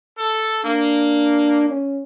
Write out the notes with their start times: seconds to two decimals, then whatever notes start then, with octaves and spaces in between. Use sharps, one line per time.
0.18 A4
0.65 A#3 D4
1.69 C#4